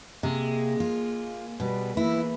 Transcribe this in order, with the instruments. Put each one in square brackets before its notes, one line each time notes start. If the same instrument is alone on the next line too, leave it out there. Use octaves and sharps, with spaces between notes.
[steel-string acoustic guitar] C3 [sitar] G#3 [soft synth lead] A#3
[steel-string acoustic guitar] F4
[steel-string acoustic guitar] B2 [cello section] G3 B4
[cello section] E3 A#3 B4 [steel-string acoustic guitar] E4 [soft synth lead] E6